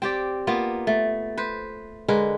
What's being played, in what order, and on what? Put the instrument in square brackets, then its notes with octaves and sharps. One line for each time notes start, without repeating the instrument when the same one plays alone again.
[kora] C4 G4 D5
A#3 B3 F4
A3
B4 C5
D3 G#3 A#4 B4